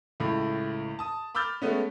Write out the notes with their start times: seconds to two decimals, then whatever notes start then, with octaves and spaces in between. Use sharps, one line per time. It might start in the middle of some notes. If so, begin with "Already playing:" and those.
0.20 C#2 A2
0.99 A5 D#6
1.35 B5 D6 E6 F6 G6 A6
1.62 G#3 A3 B3 C#4